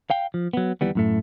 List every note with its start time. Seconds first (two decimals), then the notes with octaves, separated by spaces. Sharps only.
0.10 F5 G5
0.34 F3
0.53 F#3 B3
0.81 D#2 E3 G3 B3
0.95 F#2 A2 A3